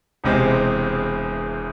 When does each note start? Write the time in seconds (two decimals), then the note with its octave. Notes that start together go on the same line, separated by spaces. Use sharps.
0.24 E1 E2 C3 G#3 C4